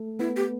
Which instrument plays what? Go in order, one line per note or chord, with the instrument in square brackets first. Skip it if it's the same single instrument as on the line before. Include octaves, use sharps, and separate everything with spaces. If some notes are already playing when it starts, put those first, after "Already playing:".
Already playing: [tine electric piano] A3 A4
[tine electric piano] B3 B4 [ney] E4
[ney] G4